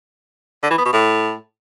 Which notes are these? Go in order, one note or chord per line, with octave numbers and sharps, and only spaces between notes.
D3
E3
B3
B2
A2